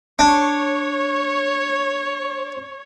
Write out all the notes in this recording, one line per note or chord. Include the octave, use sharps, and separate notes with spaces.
D4 C#5